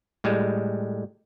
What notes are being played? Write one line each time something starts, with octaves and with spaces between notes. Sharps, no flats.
A2 G3 G#3